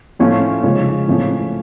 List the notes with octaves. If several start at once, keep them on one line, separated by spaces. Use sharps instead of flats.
A2 F3 A3 C#4 F4
C#3 F3 G#3 C#4
A2 F3 A3 C#4